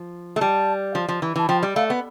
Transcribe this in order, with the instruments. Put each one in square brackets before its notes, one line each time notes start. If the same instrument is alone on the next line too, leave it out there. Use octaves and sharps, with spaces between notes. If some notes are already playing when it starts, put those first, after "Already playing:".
Already playing: [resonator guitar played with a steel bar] F3
A3
[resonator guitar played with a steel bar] G3 [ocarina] A5
[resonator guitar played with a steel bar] F3
F3
E3
[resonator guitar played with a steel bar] E3 [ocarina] A5
[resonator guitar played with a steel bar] F3 [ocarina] G5
[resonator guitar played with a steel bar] G3
[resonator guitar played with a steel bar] A3 [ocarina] F5
[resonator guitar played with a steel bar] B3